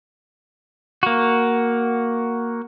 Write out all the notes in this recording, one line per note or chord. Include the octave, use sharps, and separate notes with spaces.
A#3 F#4